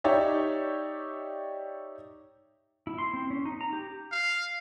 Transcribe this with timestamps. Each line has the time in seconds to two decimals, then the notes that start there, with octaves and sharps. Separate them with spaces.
0.04 D#4 G4 C#5 D5 E5
2.87 E4
2.98 C6
3.14 C4
3.30 C#4
3.45 D#4
3.61 A#5
3.73 G4
4.12 F5